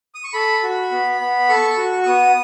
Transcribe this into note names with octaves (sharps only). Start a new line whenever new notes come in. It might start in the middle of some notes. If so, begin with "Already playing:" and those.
D#6
C#6
A4 B5
F#4
B3
B3
A4 C#6
F#4
C#6
B3 D#6